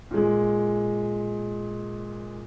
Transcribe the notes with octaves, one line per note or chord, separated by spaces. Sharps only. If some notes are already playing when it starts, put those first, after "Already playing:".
A#2 G#3